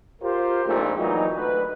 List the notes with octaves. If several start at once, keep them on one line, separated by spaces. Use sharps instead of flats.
F4 G4 A#4 C5
A#1 F2 G#2 A3 C4
A#2 E3 F#3 D#4
D2 D3 B4